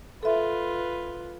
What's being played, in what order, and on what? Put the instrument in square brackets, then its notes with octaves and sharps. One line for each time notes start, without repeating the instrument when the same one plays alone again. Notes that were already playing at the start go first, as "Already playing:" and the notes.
[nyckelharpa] F4 B4 [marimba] A4 E5